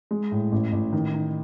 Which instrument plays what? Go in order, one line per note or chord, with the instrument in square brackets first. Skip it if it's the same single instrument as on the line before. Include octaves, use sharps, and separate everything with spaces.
[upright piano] G#3
A2
A1
A1
D#3
D#4